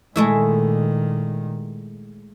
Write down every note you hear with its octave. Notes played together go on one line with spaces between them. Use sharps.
A#2 D#3 G#3 A3 E4